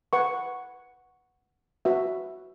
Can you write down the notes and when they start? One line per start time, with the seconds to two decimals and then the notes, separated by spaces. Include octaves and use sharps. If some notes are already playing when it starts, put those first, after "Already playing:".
0.13 B4 F#5 C#6
1.85 F#4 B4 E5